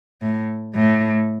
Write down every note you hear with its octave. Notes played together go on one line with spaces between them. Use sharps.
A2
A2